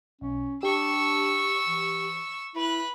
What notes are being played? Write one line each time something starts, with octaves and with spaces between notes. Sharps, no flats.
B1 C#4
D4 G4 C#6 E6
E3
E4 B4 F#6